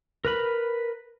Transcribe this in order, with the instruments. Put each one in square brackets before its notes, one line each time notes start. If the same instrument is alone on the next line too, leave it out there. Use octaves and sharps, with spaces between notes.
[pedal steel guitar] A#4 B4 B5